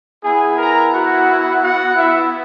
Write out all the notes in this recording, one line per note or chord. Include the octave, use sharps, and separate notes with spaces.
B3 E4 G#4 G#5
A#4 A#5
F#4 F#5
F#4 F#5
E4 E5